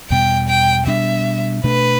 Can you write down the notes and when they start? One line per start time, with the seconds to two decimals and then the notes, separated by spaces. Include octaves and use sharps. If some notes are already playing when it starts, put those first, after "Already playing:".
0.10 E2 B2 G3 G5
0.49 G5
0.87 B2 G3 D4 E5
1.64 B2 A3 D4 B4